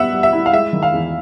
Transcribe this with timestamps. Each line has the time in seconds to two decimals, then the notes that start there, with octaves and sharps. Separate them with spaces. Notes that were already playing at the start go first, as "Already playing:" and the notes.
Already playing: G3 B3 E5 F#5
0.12 G3
0.23 E5
0.33 E4
0.46 F5
0.53 G#3 E5
0.73 D#3
0.83 F5
0.93 E2